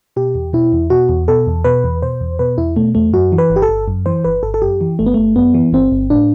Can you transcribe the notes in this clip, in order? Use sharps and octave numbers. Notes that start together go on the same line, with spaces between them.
B2 G4
E2
B2 E4
E2
B2 F#4
E2
B2 A4
E2
B2 B4
E2
B2 C5
E2
B2 B4
E2 E4
B2 A3
E2 A3
F#2 F#4
E3
B4
G1
G4
A4
G1
F#2
E3 C5
G1 B4
G1 A4
A4
F#2 G4
E3
G1 A3
B3
G1 A3
F#2 B3
E3
G1 C4
G1
A2 D4